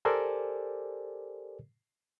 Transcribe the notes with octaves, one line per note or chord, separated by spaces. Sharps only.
G4 A4 A#4 C5 D5 G#5